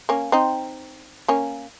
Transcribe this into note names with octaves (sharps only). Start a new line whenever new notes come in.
A#3 C#4
C4 D#4
A#3 C#4